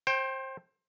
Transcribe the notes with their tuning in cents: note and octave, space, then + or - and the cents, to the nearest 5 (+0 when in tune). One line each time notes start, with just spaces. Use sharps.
C5 +25 G5 +0